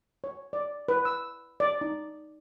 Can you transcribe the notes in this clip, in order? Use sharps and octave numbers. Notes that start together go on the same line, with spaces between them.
C#5
D5
B4
E6
D5
D#4